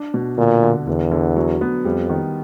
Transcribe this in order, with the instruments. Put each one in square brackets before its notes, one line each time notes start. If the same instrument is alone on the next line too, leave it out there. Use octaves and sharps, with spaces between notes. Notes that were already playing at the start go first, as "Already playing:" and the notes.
Already playing: [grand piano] D4
B2
[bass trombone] A#2 [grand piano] D3
[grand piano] D3
[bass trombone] E2 [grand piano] D3
[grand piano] D3
F#3
B3
[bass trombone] F2 [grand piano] G3
[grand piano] D#3